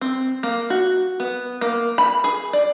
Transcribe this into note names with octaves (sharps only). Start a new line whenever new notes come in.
C4
A#3
F#4
B3
A#3
B5
G#4
D5